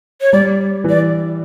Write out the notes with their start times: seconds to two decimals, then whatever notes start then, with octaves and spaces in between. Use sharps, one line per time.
0.21 C#5
0.33 G3 D5
0.84 E3
0.89 D5